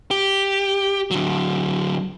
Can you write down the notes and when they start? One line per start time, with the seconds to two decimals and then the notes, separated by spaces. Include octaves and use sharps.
0.11 G4
1.11 D3 F#3